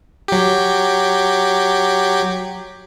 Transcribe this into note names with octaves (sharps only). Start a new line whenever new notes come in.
F#3 G4